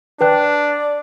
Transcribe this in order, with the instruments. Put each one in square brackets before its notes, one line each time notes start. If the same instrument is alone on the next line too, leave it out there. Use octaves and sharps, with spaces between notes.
[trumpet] D4 [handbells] B4 G5 F#6 [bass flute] D5